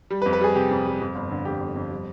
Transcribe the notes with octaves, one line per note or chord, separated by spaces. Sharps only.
G3
B4
F2
B4
G3 G#4
C3 G4
F2
G3
F2
G1
D3
F2 G4
G1
F2
G3